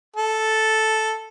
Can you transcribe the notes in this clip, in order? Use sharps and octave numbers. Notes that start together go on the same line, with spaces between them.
A4